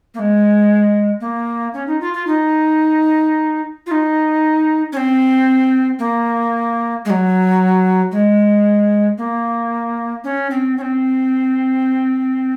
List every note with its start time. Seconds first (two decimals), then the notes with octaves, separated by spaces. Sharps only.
0.14 A#3
0.19 G#3
1.21 A#3
1.74 C#4
1.87 D#4
2.01 F4
2.14 F4
2.27 D#4
3.87 F4
3.91 D#4
4.92 C#4
4.97 C4
5.99 A#3
7.05 G#3
7.10 F#3
8.12 G#3
9.18 A#3
10.24 C#4
10.50 C4
10.77 C#4
10.82 C4